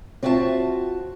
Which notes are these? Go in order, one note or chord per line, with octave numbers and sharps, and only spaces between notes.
C4 F4 F#4 E5 F5 A5